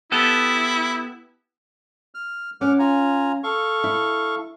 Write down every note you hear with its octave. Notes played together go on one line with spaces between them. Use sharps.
B3 E4 G4 A4
F6
C#4 F#5 D6 F6
F4 G#5 A#5
A4 F5 C#6
E4